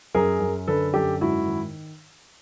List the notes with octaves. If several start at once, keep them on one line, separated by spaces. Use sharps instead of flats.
F#2 G#4 A#4
F#2
D3 A4 B4
F#2 G4 A4
G#2 E4 F#4
D#3